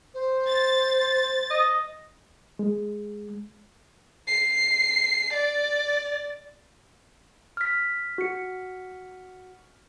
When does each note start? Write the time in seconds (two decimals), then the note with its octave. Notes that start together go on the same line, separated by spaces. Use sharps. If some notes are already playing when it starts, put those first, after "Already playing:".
0.14 C5
0.47 A6
1.50 D#5
2.59 G#3
4.28 C7
5.33 D5
7.57 F6 B6
8.18 F#4 C#7